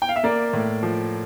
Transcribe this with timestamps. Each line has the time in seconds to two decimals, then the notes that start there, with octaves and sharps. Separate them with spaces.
0.02 G5
0.09 F5
0.16 E5
0.23 A#3 A#4 D5
0.53 A2
0.83 F3